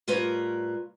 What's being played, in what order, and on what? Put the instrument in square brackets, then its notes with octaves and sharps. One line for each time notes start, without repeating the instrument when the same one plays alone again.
[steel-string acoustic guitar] A2 G3 F4 A#4 B4 C#5